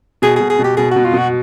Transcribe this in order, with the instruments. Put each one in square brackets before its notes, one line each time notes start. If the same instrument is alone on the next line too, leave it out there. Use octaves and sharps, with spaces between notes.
[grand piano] B2 [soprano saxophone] G#4
[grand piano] B2 [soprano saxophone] G#4
[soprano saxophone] G#4
[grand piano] B2 [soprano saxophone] G4
[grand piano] B2 [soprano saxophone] G#4
[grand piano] B2 [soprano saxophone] F#4
[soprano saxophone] F4
[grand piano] B2 [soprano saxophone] F#4